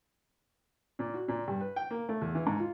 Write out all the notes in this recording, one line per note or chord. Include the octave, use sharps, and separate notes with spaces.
A#2
F#4
A#2
G2
B4
G5
A#3
A3
E2
E3
G#2
F4